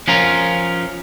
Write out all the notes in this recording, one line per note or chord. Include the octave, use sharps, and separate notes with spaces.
F3 C#4 F4 A#4